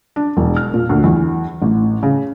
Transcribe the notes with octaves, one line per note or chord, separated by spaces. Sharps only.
D4
E1
F6
A#2
D2
E2
A1
C#3